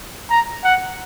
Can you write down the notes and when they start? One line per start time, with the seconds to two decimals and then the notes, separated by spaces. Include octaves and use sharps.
0.30 A#5
0.64 F#5